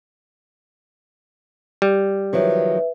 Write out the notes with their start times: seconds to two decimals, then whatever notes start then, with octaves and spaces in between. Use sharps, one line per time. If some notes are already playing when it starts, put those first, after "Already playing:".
1.82 G3
2.33 D#3 F3 F#3 B4 E5